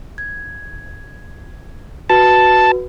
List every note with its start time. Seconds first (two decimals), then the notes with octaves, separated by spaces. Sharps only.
0.18 G#6
2.10 F#4 B4 A5